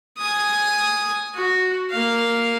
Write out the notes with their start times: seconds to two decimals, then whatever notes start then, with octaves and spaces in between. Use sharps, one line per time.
0.18 G#5 D#6
1.35 F#4
1.90 A#3 F5